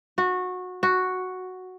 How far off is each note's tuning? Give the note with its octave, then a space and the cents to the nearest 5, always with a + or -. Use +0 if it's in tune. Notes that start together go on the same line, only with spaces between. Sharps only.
F#4 -20
F#4 +0